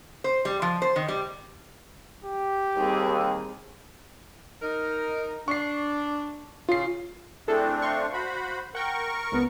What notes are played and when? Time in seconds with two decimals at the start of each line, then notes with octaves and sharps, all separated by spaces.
0.24 C5
0.45 G3
0.62 F3
0.82 C5
0.96 D#3
1.09 G3
2.24 G4
2.77 D#2 G3 C4 G#4
4.62 D#4 A#4
5.48 D4 C#6 C7
6.69 C#3 F4 C7
7.48 A3 C4 D4 E4 G#4 A4
7.82 F5 C6 C#6
8.13 F#4 C5 B5
8.75 A#4 F#5 G5 C#6
9.32 C#2 B3